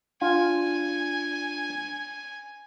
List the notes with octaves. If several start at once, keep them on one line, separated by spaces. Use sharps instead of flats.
D4 F4 G#5